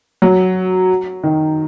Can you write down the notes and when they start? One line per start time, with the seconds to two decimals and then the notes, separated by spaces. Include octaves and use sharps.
0.22 F#3
1.23 D#3